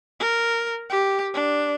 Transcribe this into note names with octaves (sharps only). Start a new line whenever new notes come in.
A#4
G4
D4